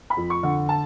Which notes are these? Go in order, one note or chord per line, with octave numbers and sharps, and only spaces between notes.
B5
F2
C#6
D3
A5